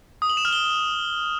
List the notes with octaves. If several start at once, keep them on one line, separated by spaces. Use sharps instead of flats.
D#6
F#7
E7
F6
G7